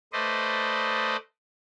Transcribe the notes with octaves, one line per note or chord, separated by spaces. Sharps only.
A3 B4 C5 D5 D#5